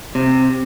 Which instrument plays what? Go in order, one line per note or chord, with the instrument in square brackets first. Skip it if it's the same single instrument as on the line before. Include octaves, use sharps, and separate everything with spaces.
[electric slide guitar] C3